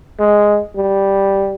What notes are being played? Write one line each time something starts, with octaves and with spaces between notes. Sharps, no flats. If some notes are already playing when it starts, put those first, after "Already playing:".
G#3
G3